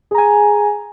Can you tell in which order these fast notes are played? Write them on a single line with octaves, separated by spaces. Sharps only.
G#4 A#5 G#5